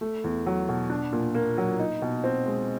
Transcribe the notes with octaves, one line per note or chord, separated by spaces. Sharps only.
A3
E2
F#3
B2
D4
A#2
A#3
F#3
D#4
B2
C4
G#3